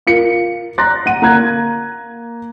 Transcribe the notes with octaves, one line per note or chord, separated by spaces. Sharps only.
F4 A#4 C#7
A#5 C6 F#6 A6 A#6
F#5 D#7
A#3 A#5 F#6 G#6